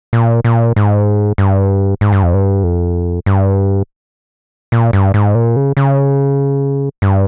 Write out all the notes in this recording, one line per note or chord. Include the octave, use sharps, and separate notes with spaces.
A#2
A#2
G#2
G2
G#2
G2
F2
G2
F2
G2
A#2
G2
G#2
A#2
C#3
C#3
G2